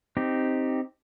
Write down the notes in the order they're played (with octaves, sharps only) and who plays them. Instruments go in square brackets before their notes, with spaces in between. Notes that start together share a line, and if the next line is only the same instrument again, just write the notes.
[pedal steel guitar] C4 D#4 G4